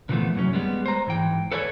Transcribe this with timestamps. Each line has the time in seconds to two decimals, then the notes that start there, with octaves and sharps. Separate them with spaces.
0.09 A#2 D3 E3 F3 A3 B3
0.34 C2 F#2 F#3 C#4
0.53 G3 G#3 B3
0.86 C5 A#5
1.07 G#2 E3 G5
1.52 A4 B4 C#5 D5 F5 G#5